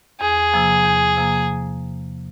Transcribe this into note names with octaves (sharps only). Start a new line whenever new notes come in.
E2 G#4
C3 F3 A#3
E2
C3 F3 A#3